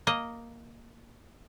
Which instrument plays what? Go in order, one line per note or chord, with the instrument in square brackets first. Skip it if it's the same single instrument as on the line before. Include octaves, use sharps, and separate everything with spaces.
[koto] A#3 D#5